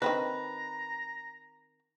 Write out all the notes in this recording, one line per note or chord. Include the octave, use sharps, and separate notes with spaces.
D#3 C4 D4 B4 A#5